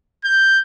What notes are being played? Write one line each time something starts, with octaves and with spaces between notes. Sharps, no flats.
G6